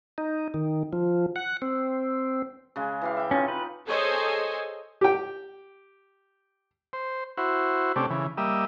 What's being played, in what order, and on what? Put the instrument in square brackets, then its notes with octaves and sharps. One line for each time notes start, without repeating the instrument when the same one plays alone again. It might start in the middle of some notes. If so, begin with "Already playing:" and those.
[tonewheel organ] D#4
D#3
F3
F#5
C4
[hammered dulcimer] C#3 G#3
E3 G4 F5
E5 G5
[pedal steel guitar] C#4 [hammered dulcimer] D#4 F4
[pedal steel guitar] B4
[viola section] G#4 A4 C5 C#5 D#5 G#5
[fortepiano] G4 G5
[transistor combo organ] C5
E4 F#4 C5
C3 A3 C#4 D4 G4
C#3 E3
G3 A#3 D#5 E5